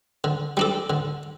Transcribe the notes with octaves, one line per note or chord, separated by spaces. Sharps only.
D3
G3 D4 A4
D3